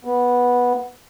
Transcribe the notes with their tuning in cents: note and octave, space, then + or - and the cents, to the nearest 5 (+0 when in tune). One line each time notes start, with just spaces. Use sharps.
B3 -10